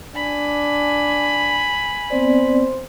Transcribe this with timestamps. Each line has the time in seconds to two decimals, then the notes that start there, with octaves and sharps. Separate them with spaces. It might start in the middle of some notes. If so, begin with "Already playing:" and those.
0.15 D4 G#5 B5
2.11 B3 C4 C5 D5